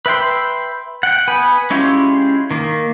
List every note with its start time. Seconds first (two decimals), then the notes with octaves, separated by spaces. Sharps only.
0.06 B4 E5 G5 C6
1.03 F#5 G5
1.28 B3 B4 G#5
1.70 G#3 C#4 E4 F4 G4
2.51 D#3 A#3